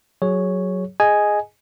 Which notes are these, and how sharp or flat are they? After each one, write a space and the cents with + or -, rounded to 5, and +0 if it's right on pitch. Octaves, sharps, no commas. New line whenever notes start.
F#3 +0 G#4 +0 C#5 +0
G#4 +0 D#5 +0 G#5 +0